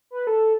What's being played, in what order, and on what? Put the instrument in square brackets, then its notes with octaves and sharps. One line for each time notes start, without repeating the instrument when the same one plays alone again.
[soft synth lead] B4
A4